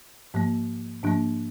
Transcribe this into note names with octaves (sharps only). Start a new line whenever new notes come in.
G#2 F3 A#3
G#2 F3 A#3 D4